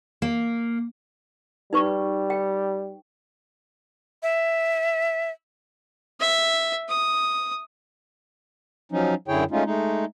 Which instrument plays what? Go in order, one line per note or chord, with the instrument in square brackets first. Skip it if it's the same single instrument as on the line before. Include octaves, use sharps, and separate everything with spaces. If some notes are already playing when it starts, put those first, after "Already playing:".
[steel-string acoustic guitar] A#3
[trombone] G3 [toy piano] D#4 B4 C#6
[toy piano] G5
[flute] E5
[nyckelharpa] E5
D#6
[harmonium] F3 F#3 C#4 D#4
F#2 D3 E4 G#4 C#5 G5
G#3 A3 C#4 D#4 F4
G#3 A3 D#4